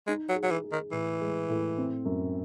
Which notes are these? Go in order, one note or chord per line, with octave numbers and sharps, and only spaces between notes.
G#3 D#4
F#3
G#4
F#3
E3
G#4
D#3
A2 E3
G#3
A2
C4
F#2